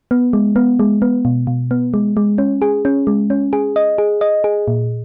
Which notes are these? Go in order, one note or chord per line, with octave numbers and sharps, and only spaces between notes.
B3
G#3
B3
G#3
B3
B2
B2
B3
G#3
G#3
C#4
G#4
C#4
G#3
C#4
G#4
D#5
G#4
D#5
G#4
A#2